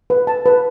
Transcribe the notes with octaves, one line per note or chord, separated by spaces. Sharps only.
B4
A5
B4